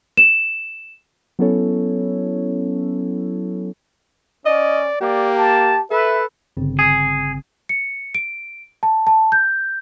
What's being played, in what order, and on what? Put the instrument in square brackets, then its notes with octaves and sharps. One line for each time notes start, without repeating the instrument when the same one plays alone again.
[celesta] E7
[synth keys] F#3 B3 C#4 E4 A4 C#5
[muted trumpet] C#4 [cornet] D5 [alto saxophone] D#5
[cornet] A#3 [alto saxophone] G4 [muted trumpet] D5
[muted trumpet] A5
[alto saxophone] A4 [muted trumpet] B4 [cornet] E5
[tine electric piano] G1 C#3 C4
[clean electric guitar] G#4
[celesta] C#7
D7
A5
A5
G6